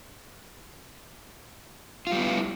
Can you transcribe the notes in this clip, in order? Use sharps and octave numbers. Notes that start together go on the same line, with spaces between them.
G3 B3 E4 F4